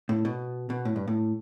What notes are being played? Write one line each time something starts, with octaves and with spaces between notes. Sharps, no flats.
A2
B2
B2
A2
G2
A2